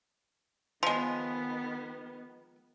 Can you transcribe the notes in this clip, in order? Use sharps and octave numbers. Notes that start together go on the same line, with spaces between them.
D#3 F3 G#3 B3 C6